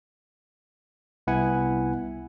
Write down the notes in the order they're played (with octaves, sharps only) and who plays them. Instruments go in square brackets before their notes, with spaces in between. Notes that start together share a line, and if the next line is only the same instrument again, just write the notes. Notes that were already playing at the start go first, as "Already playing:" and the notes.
[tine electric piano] C2 B3 E4 F#5 G#5